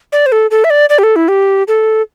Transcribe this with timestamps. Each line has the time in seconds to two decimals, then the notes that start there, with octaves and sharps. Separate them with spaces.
0.12 D5
0.26 C5
0.32 A4
0.51 A4
0.64 E5
0.70 D5
0.90 D5
0.99 G4
1.03 A4
1.16 E4
1.28 G4
1.68 A4